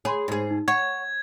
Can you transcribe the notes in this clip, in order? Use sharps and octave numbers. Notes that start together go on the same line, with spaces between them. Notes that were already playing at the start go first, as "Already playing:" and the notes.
G#4 C#5 B5 C6
G#2 G#4
D#4
C#5 F#5 G#6